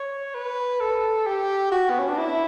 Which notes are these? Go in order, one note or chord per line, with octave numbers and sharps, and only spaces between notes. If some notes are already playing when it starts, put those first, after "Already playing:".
Already playing: C#5
B4
A4
G4
F#4
B3
C#4
D4
E4